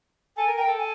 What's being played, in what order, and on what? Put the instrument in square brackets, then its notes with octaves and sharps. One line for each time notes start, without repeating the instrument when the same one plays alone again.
[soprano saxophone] A4 [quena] G#5
[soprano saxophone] A#4
[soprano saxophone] A#4 [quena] G5
[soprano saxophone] A4
[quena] G#5